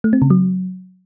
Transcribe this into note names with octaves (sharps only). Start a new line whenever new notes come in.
A3
C4
C#3
F#3